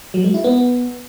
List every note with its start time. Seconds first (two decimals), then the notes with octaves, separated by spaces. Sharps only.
0.14 F#3
0.24 G#3
0.34 E4
0.44 B3